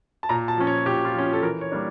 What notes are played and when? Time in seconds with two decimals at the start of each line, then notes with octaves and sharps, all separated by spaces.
0.23 A5
0.29 A#2 A#5
0.48 A5
0.57 F3 C#4
0.67 C#5
0.85 A#2 G4
1.05 F4
1.14 F3 C#4
1.33 A4
1.42 E3 A#4
1.61 C#5
1.72 G3 A#3 D4